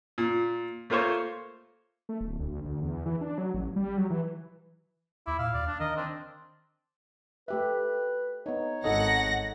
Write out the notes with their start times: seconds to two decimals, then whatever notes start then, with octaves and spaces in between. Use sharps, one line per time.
0.18 A#2
0.90 A3 A#3 F4 C5 C#5
2.09 A3
2.20 D1
2.39 D2
2.66 D2
2.82 E2
3.06 E3
3.21 D4
3.38 F#3
3.54 A1
3.76 G3
3.97 F#3
4.10 E3
5.27 D#2 E4 D6
5.39 A#2 F5 E6
5.54 D#2 D5
5.67 D4
5.80 D#3 A#4 D#5
5.97 C4 D4
7.48 A3 G4 B4 E5
8.46 B3 D#4 C#5
8.84 G#1 D#4 A4 D#5 F#5 A#6